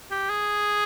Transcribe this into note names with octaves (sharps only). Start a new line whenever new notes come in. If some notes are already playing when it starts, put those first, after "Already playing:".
G4
G#4